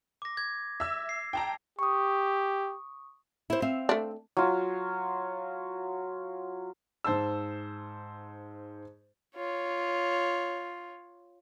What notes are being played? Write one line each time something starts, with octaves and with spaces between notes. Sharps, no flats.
D6 A#6
G#6
E5 E6
C7
G5 A5 A#5
G4 C#6 D#6
E4 C5
C4 E5 F5
A3 D4
F#3 F4
G#2 C5 A5 E6
F4 C#5